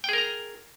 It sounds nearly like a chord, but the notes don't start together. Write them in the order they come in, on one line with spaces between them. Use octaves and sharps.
G5 G#4 A#4 A#5